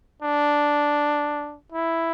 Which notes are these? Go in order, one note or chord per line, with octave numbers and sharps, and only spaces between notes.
D4
E4